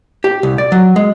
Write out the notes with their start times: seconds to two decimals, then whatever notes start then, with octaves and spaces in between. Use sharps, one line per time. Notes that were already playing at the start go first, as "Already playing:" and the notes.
0.24 G4
0.43 C2
0.58 D5
0.72 F#3
0.96 G#3